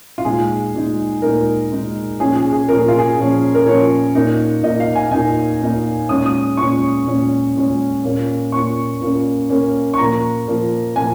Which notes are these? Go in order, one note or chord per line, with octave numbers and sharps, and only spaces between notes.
F4
A#2 G#3 D#4 G#4
A#2 G#3 D#4
A#2 G#3 D#4 A#4
A#2 G#3 D#4
A#2 F3 C#4 G#4
G#4
G#4
A#2 F3 C#4 A#4
G#4
F4
G#4
A#2 F3 C#4
A#4
A#2 F3 C#4 C#5
A#2 A#3 D#4
A#2 A#3 D#4 D#5
F5
G#5
A#2 A#3 D#4 G#5
A#2 A#3 D#4
A#2 G#3 C#4 D#6
D#6
A#2 G#3 C#4 C#6
A#2 G#3 C#4
A#2 G#3 C#4
A#2 A#3 C#4
A#2 A#3 C#4 C#6
A#2 A#3 C#4
A#2 A#3 C#4
C#6
A#2 F3 A#3 A#5
A#2 F3 A#3
A#2 F3 A#3 G#5